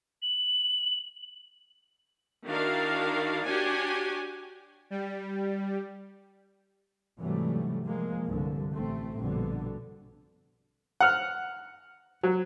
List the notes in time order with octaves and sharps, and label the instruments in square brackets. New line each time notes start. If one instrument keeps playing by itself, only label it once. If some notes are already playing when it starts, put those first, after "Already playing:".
[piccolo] F#7
[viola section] D#3 D4 E4 F#4 A#4 F5
D4 F#4 G4 C#5 F#5 G#5
[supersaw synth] G3
[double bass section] G#2 C3 E3 F#3 G3 A3
F3 G#3 A#3
C2 G2 D3
A1 A3 C4
A#1 G2 B2 D3
[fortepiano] F#5 F6
F#3